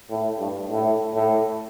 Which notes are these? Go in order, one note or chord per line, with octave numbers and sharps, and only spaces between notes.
A2
G2
A2
A2